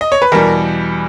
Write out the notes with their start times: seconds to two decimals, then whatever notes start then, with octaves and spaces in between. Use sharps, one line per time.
0.01 D#5
0.12 C#5
0.22 B4
0.32 E2 B2 G3 A#4